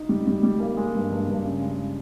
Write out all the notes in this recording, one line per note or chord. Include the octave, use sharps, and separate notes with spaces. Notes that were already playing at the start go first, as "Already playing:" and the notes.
Already playing: D#4
G3
G3
G3
A#3
G#3
G2
G2
G2
C#3
G#3